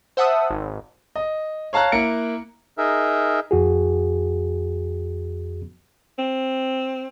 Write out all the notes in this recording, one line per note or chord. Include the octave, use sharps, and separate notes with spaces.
C5 E5 F#5 A5 D#6 E6
G#1
D#5
C#5 F5 A5 A#5 F#6
A#3 E4 A#5 C#7 D7
D#4 G#4 A#4 E5
F2 F#4 G#4
C4